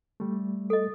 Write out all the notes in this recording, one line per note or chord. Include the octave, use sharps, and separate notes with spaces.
G3 A3
A4 D#5